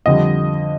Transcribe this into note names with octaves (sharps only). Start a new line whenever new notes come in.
F2 D3 G3 D#5